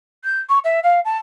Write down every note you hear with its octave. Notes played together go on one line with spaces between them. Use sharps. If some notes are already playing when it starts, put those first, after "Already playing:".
G6
C#6
E5
F5
A5